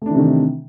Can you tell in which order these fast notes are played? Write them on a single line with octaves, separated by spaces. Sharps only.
A3 D4 E3 C3 D#3